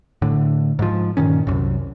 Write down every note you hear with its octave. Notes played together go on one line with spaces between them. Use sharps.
A2 D3
G#2 F3
G2 A#2 D#3 C#4
C2 F#2